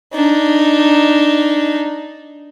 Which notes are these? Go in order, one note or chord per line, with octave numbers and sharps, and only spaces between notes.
D4 D#4